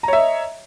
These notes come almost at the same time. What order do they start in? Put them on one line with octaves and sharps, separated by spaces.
A#5 C#5 E5 D#5